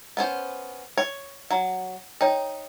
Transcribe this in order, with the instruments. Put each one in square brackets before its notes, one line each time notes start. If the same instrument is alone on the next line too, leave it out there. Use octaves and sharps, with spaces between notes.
[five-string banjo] B3 C#4 C5
C#5
F#3
[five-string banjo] D#4 [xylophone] C#5 G5